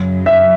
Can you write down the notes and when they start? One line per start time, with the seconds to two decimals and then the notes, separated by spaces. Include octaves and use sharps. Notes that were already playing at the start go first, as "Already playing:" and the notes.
Already playing: F#2 C#3 F#3
0.26 E5